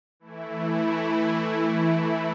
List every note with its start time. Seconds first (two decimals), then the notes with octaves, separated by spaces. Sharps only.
0.20 E3 A3 E4